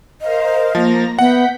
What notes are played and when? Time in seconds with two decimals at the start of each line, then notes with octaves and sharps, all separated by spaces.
0.21 A#4 C5 D#5 F5
0.75 F3 A#3 A#5 A#6
1.19 B3 E5 F#5 G6 B6